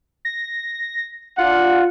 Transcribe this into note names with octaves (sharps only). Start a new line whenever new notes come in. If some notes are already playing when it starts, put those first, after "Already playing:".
A#6
D4 F4 F#5